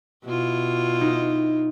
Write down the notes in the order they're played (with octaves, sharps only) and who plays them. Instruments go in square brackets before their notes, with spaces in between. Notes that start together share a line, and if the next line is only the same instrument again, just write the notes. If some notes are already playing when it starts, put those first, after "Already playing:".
[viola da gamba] B2 E4 F4
[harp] D#4